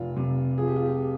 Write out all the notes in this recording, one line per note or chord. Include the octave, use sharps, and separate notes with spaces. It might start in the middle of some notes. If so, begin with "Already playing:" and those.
Already playing: F1 F4
C3
F3 G#4
G4
F4
G4